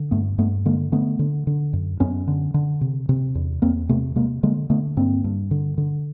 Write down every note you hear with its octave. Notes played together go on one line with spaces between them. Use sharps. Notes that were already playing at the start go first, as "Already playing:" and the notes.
Already playing: D3
G2 A3 B3
G2 A3 B3
D3 G#3 A#3
D3 A3 B3
D3
D3
F#2
F#2 B3 C#4
D3
D3
C3
C3
E2
E2 A#3 C4
C3 A3 B3
C3 G#3 A#3
D3 G#3 A#3
D3 A3 B3
G2 A#3 C4
G2
D3
D3